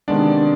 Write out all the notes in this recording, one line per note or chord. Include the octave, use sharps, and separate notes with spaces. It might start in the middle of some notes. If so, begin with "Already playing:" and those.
C3 D#3 G#3 B3 D4 D5